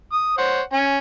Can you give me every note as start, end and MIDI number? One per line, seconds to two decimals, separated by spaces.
0.12 0.33 87
0.38 0.62 72
0.38 0.62 73
0.38 0.62 78
0.73 0.99 61
0.73 0.99 80